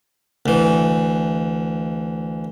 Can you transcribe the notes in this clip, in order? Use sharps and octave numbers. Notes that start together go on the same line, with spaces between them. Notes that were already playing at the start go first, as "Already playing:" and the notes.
D2 E3